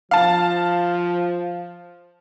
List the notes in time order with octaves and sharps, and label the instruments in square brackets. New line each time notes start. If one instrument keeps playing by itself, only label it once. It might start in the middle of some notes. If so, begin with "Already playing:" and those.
[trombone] F3 [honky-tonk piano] F5 A5